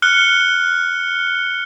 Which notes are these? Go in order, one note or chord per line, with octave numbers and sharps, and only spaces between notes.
F6 F#6 C#7 G7